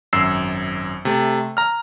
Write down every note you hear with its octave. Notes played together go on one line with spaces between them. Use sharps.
G#1 F#2 E6 C7
C3 A3
A#5 F6